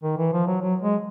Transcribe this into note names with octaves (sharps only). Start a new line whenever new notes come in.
D#3
E3
F3
F#3
F#3
G#3